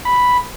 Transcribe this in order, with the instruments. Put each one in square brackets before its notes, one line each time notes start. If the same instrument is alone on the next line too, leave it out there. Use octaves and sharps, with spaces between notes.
[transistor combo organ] B5